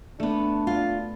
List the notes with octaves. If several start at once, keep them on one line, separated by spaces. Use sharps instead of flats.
A3 B3 D4
F4